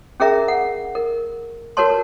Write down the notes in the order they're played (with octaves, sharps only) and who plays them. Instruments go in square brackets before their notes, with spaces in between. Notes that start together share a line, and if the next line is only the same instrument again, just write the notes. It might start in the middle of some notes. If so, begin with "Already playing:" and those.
[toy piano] C#4 G#4 A#4 E5 A#5
F#5
A#4
F#4 A#4 B4 C#5 A5 C6